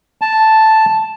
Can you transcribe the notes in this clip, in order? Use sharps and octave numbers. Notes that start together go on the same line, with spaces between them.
A5